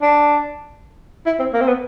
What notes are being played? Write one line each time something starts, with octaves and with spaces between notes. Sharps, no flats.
D4
E4
C4
A#3
C4
B3